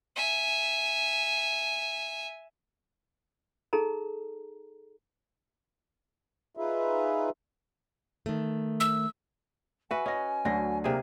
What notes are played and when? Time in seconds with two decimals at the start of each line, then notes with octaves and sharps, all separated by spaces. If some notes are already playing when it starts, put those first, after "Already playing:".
0.16 E5 G#5
3.73 D#4 G#4 A4 A#5
6.57 D#4 F4 G#4 B4 E5
8.26 D#3 A3
8.80 E6
9.91 F#4 B4 E5 G#5
10.06 C#4 D#5 A#6
10.45 D2 D3 F#3 A#6
10.84 C3 A#3 G#4